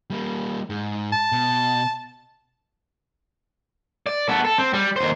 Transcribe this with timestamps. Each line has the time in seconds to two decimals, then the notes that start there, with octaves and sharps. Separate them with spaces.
0.10 G3 A#3
0.70 G#2
1.12 A5
1.32 B2
4.06 D5
4.29 B3 A4
4.45 A4
4.58 C4
4.74 G3
4.96 D#2 C5